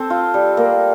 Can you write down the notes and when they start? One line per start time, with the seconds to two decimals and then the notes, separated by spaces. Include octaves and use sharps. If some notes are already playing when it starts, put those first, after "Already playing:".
Already playing: C4 A4
0.10 F4
0.34 G3
0.57 A#3